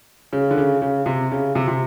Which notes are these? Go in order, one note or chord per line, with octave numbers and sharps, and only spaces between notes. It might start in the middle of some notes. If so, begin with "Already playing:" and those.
C#3
D3
C#3
C#3
C3
C#3
C3
C3